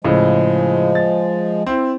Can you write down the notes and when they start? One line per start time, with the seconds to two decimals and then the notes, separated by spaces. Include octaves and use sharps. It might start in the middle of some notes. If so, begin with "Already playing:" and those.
0.04 A2 C#3 F3 G#3
0.95 A6
1.66 C4 E4